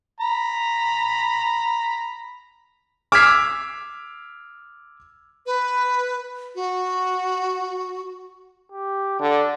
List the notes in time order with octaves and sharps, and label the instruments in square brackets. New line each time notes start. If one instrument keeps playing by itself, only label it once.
[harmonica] A#5 B5
[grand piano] D6 E6 F6 G#6 B6 C7
[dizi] B4
F#4
[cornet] G4
[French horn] D3 [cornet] D4